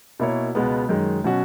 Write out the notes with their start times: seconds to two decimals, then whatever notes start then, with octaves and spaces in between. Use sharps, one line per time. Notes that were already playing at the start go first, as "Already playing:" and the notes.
0.20 B2 A#3 E4 A#4 C#5
0.55 C#2 B2 G#3 B3
0.89 F#2 D#3 G#3
1.24 B2 F#3 C#4 F#4